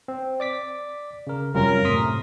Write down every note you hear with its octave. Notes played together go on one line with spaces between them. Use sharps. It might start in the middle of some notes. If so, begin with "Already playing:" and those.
C4
D5 D6 B6
C#3 A#4
F#2 C3 G3 C#4 F4 A#4
A2 C3 C6 D#6 B6